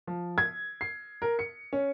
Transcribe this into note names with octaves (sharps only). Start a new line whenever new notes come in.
F3
G#6
C7
A#4
C#7
C#4